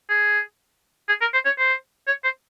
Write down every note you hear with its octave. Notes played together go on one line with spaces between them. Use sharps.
G#4
G#4
A#4
C5
C#5
C5
C#5
C5